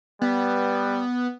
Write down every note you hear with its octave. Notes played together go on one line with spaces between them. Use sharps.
G3 B3